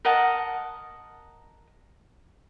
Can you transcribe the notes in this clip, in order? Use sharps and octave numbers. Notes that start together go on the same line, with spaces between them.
A#4 D#5 F#5 A5